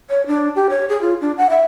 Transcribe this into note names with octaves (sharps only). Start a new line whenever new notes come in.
C#5
D4
G4
C#5
G#4
F4
D4
F#5
E5